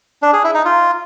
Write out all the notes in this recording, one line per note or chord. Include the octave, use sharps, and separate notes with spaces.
D4
G#4
E4
D#4
F4